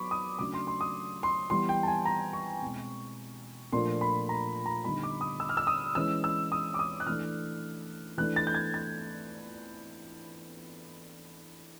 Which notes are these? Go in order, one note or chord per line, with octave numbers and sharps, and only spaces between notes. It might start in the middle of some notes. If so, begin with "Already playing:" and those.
Already playing: F#3 B3 B5 C#6 D6
D#6
C#3 F#3 A3 D4 D6
C6
C6
D#6
C6
E3 G3 B3 C6
G5
A5
G#5
A#5
C#6
B2 G#3 C4
A#2 F3 A3 D4 C6
B5
A#5
A#5
D3 G3 B3 D#4 B5
D6
D#6
E6
F6
E6
D#6
E3 G#3 C#4 E6
E6
D#6
D6
D#6
F#6
E3 A3 D4 F6
E3 A3 D4 F#6
A6
G6
G#6
A6